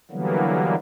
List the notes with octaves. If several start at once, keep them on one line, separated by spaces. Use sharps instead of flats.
D3 E3 F#3 G3 A#3 B3